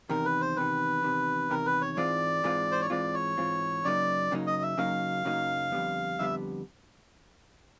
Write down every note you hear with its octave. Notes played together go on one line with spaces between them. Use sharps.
E2 C3 D#3 A#4
B4
C5
E2 C3 D#3 B4
E2 C3 D#3
E2 C3 D#3 A#4
B4
C#5
G#2 E3 G#3 C4 F4 D5
G#2 E3 G#3 C4 F4
C5
C#5
G#2 E3 G#3 C4 F4 D5
C#5
G#2 E3 G#3 C4 F4
F#2 C#3 F#3 A#3 D#4 D5
F#2 C#3 F#3 A#3 D#4
D#5
E5
F#2 C#3 F#3 A#3 D#4 F5
F#2 C#3 F#3 A#3 D#4
F2 D3 G3 B3
F2 D3 G3 B3 E5